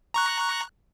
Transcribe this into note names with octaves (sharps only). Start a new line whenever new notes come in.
A#5 C#6 F#6